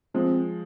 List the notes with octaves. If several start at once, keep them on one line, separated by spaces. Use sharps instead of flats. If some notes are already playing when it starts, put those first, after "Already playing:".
F3 G#3 C4